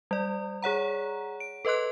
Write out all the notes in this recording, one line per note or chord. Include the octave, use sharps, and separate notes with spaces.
G3 D5
G#4 C#5 F#5 A#5
D7
A4 B4 D#5 C6 F#6